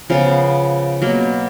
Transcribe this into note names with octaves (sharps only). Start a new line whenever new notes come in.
C#3 F3 B3 F4
B2 F#3 A#3